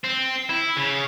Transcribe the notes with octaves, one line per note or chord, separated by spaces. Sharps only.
C4
E4
C#3